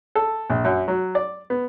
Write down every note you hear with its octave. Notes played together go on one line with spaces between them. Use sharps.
A4
A#1
F#2
F#3
D5
B3